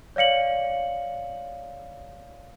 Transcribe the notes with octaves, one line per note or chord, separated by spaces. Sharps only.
C#5 D5 F5 C#7 F#7